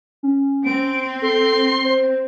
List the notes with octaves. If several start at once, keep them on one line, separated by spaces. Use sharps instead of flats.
C#4
C4 D7
A4 C6
C5